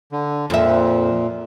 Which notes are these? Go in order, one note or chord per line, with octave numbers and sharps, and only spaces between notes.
D3
F2 A#2 E5